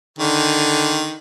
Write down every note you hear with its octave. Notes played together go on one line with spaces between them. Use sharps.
D3 D#3